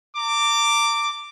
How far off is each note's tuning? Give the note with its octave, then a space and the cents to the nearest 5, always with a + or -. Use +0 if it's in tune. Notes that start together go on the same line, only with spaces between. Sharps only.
A#5 -35 D6 +0